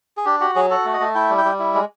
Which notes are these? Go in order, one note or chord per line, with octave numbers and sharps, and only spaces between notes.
G#4
D4 G4
F#4 G4
F#3 G#4
F#4 A4
A3
D#5
A3
E4 G5
G3
G5
G3
E4
G#3